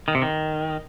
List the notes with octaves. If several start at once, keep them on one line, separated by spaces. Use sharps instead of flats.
D#3
C3
D#3